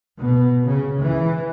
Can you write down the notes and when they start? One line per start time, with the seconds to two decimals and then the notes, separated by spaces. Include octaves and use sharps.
0.19 B2
0.65 C#3
1.00 E3